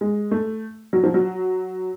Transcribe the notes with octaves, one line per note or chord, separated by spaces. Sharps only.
G#3
A3
F#3
F3
F#3